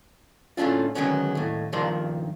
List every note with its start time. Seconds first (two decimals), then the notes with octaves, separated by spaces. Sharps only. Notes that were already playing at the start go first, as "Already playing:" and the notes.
0.57 A2 A3 C#4 D4 F4
0.95 D3 D#3 F#3 G#3 B3 C#4
1.35 D#2 A2
1.73 G2 D#3 F3 A#4 D5 C6